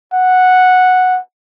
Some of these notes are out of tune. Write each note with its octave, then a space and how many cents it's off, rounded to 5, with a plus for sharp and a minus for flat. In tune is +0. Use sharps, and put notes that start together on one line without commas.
F#5 -5